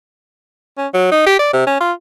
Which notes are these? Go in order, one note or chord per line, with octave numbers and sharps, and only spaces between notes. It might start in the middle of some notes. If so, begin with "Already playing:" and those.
C#4
F#3
D#4
G4
D5
C3
C#4
F4